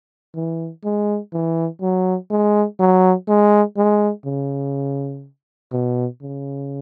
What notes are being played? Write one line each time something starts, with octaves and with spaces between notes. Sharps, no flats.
E3
G#3
E3
F#3
G#3
F#3
G#3
G#3
C#3
B2
C#3